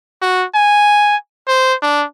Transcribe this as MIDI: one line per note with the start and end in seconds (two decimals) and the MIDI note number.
0.22 0.45 66
0.55 1.16 80
1.48 1.74 72
1.82 2.05 62